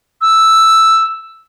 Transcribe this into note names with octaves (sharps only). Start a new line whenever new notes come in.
E6